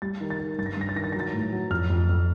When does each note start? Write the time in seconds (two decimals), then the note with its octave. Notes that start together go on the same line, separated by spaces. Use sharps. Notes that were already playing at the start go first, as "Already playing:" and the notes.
0.02 G3 A6
0.21 D#3
0.30 A6
0.40 D#3
0.58 G2 A6
0.66 A#6
0.74 A6
0.77 G2 A#6
0.89 A6
0.95 D#3 A#6
1.04 A6
1.12 A#6
1.15 F#3 A6
1.33 A2
1.52 F#3
1.70 F2 F6
1.90 F2
2.09 F2